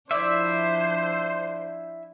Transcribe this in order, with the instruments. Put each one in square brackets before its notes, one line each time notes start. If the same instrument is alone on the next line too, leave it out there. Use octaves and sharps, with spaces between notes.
[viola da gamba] F3 D4 [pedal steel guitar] E4 E5 [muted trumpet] C5 [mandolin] D5